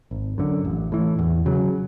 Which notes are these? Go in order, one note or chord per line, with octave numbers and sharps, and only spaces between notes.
G#1
F#2 D3
A1
A2 E3
E2
C#3 F#3